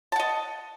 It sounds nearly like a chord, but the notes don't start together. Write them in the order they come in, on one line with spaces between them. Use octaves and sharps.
A5 F#5 D#5